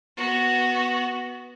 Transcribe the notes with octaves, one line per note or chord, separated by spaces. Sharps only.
B3 F#4